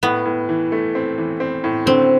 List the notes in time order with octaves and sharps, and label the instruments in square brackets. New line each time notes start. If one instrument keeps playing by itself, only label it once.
[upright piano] A2 [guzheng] B3
[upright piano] A2
E3
A3
C4
E3
C4
A2
[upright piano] D3 [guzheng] C4